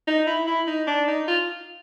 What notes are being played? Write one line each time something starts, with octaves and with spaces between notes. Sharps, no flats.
D#4
E4
E4
D#4
D4
D#4
F4